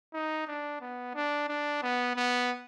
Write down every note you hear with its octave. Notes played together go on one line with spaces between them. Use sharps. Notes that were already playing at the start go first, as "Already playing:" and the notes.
D#4
D4
B3
D4
D4
B3
B3